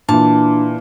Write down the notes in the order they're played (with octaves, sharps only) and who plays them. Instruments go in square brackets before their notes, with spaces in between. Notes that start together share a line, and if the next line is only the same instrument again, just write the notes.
[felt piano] A#2 E3 [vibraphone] D4 [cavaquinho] A5